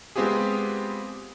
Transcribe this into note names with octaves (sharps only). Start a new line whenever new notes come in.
G#3 B3 C4 F4 G4 G#4